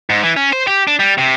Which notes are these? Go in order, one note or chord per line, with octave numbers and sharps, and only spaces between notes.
G#2
E3
C#4
C5
G4
D4
G3
C3